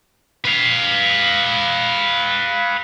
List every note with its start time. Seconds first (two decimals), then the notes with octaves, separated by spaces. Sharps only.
0.45 B4 F5